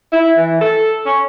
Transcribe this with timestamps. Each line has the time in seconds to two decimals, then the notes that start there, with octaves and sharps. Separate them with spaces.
0.13 E4
0.37 E3
0.61 A4
1.06 C#4